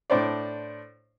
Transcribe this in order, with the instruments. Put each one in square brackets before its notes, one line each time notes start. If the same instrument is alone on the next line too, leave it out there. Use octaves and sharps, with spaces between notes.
[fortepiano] A2 D4 C5 D5